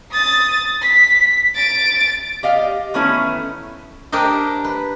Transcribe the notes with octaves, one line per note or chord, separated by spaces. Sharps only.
D#6 A6
B6
A6 D7
G4 D#5 F5
D#3 E3 A3 B3 C#4 E4
D4 G4 A#4 C5 D#5
B4